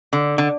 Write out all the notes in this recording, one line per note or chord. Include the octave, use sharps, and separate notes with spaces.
D3
D3